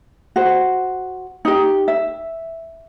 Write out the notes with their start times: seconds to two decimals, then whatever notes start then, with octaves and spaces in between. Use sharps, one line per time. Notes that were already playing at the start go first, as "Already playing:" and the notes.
0.36 F#4 C5
1.45 D#4 G4
1.88 E5